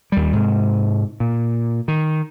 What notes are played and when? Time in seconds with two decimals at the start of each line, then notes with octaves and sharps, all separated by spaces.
0.12 D#2 G3
0.33 G#2 C3
1.20 A#2
1.88 D#3